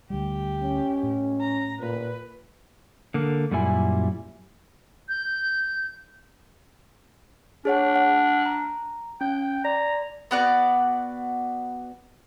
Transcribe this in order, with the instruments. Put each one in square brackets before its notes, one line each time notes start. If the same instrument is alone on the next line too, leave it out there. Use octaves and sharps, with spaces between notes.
[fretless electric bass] D2 G3 [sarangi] G4
[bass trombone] C#4
[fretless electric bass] A2
[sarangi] A#5
[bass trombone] A#2 [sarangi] B4
[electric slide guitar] D3 A#3
F#2 A#2 G3 E4 G#5
[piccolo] G6
[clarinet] D4 [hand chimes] G#4 C#5 F#5
[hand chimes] F#5
A#5
[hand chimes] C#4 [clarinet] G5
[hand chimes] D5 [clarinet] A#5
[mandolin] B3 F#4 D5